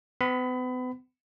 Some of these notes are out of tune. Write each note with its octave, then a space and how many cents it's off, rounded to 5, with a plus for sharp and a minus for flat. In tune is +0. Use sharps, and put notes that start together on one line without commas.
B3 +40 B5 +25